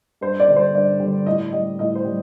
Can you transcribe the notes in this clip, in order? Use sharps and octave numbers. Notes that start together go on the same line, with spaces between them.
G2 C5
D5
D3 G3
C5
G2 D5
D3 G3
A2 D#5
G3 D#5
A2 D#5
C5
G3